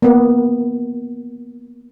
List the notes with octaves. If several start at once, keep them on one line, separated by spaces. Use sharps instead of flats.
A#3 B3